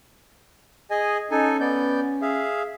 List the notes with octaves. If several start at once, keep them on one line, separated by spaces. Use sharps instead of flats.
G#4 D#5 G#5
C#4 D#4 A4 G#5
B3 D5 G6
G#4 E5 F5